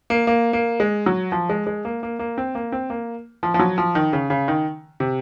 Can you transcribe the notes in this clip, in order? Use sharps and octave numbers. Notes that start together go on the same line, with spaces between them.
A#3
A#3
A#3
G#3
F#3
F3
G#3
G#3
A#3
A#3
A#3
C4
A#3
C4
A#3
F3
F3
F#3
F3
D#3
C#3
C#3
D#3
C3